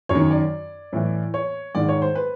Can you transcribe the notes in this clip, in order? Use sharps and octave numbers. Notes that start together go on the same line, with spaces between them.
F#2 C#5
D#3
D5
A2 E3
C#5
G#2 D#3 D5
C#5
C5
B4